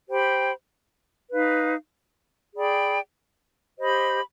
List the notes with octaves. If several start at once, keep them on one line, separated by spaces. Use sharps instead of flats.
G4 C5 G5 B5
D#4 B4 F5
G#4 D5 G5 B5
G4 C5 D#5 B5